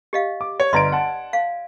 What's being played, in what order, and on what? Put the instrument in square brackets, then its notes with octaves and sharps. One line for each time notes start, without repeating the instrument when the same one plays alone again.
[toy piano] G4 D#5 F5
[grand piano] D6
C#5
[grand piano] G1 A#5 D7 [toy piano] D5 D#5 C6
[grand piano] F#5 A5
[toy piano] F5